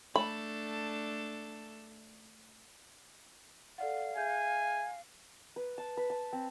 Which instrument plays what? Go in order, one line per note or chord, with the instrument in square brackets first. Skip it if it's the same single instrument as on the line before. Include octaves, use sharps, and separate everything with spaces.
[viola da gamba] A3 D4 A4 [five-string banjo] B5
[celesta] A4 D5 F#5 [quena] F5
[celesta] G#4 E5 G6 [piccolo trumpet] G#5
[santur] B4
A5
B4
A5
C4